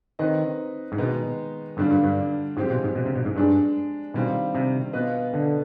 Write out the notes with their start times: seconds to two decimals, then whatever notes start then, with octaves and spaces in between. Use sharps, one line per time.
0.19 D#3 C4 D#4 B4 D#5
0.92 G#2
0.98 B2 D#3 G#3 B3 D#4
1.77 G2 D3 G3 D4 F4
1.91 G2
2.04 G2
2.57 G#2 F3 G#3 C4 G4
2.70 B2
2.84 G#2
2.95 B2
3.05 C3
3.16 B2
3.25 G#2
3.36 G2 G#3 D4 G#4
4.14 B2 D#3 G3 C4 F4
4.55 C3
4.93 B2 B3 F4 B4 D#5
5.33 D3